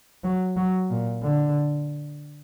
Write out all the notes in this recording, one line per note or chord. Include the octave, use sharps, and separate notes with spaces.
F#3
F#3
A#2
D3